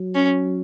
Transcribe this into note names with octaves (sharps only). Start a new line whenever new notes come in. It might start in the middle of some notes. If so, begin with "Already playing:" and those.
Already playing: F#3
C#4